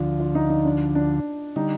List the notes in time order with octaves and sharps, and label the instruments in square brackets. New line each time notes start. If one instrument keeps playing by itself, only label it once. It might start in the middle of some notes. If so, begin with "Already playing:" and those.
Already playing: [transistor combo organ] D2 D3 F3 [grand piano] F4
[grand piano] F4
D#4
D#4
D4
D4
[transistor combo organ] D3 G3 [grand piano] D#4